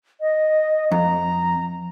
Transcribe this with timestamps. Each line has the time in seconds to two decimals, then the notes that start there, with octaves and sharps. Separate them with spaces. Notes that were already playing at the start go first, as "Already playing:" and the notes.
0.21 D#5
0.92 F2 A#5